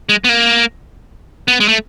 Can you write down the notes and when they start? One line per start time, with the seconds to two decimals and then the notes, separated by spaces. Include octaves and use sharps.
0.09 G#3
0.24 B3
0.29 A#3
1.48 B3
1.60 G#3
1.68 A3